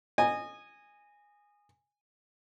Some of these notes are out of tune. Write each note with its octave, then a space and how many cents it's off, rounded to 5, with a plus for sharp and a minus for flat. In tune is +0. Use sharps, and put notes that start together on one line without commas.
D#5 -20 G#5 -10